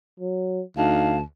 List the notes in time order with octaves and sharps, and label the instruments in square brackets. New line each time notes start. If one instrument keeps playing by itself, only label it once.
[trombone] F#3
[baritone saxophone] D2 [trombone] D#4 [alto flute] F5 [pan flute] A5